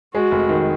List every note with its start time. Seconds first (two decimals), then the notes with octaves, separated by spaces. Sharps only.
0.14 G#3 F#4
0.31 F1
0.49 D#3